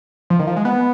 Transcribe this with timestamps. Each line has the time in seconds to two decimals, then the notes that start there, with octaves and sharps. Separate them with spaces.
0.30 F3
0.39 D#3
0.47 F3
0.56 G#3
0.65 B3